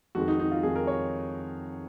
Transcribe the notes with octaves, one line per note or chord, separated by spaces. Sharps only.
F2 D#3 G#3 F#4
D#4
D#4
F4
F2 D#3 G#3 G#4
A#4
C#5